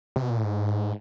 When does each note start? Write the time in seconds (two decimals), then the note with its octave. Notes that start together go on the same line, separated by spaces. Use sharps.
0.16 C3
0.22 B2
0.30 A#2
0.37 A2
0.44 G#2